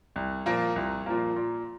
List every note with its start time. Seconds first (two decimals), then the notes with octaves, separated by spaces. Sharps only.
0.16 C2
0.46 A#2 F3 A#3
0.76 C2
1.06 A#2 F3 A#3
1.36 A#2